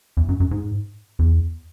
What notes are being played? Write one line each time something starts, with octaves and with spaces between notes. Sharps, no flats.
E2
F#2
F#2
G#2
E2